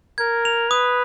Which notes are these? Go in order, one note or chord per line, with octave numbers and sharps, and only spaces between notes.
A#4 G#6
F7
B4 D#6